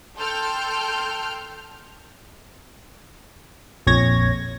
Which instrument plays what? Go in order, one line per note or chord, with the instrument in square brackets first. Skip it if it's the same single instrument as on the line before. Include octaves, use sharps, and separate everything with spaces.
[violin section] A4 G5 C6 F6 G6
[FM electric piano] A#1 F2 C#5 G#6 A#6